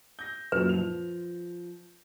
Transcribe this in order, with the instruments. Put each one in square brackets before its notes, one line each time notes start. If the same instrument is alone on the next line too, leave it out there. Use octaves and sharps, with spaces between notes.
[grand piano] G6 A#6
[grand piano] F#2 A#2 [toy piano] B4
[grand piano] F3 F7